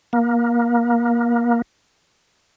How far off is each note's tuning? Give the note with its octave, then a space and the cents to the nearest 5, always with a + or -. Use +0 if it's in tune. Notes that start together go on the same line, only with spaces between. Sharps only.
A#3 +25